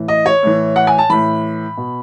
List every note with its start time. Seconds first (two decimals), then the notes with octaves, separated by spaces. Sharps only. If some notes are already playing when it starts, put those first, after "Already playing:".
Already playing: A2 E3
0.08 D#5
0.26 C#5
0.43 A2 E3
0.76 F#5
0.87 G#5
0.98 A5
1.09 A2 E3 B5
1.77 B2